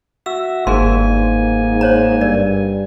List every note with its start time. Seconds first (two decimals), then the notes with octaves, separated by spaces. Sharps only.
0.26 F#4 E5 E6
0.67 G1 G#2 A#3 G#4 A#4 G#5 C6
1.81 C5 C#5 A#5
2.21 G2 A#4 D5